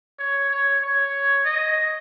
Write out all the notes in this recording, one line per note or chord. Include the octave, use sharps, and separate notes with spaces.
C#5
C#5
C#5
D#5